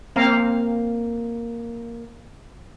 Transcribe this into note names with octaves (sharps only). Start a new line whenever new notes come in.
A#3 C4 F5 A#5